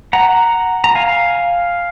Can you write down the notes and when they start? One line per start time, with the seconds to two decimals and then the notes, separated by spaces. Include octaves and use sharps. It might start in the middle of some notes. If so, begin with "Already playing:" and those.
0.13 F#5 A#5
0.84 A#5
0.95 F5 G#5